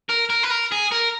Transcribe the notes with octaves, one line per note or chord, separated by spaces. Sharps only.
A#4
A#4
B4
A#4
G#4
A#4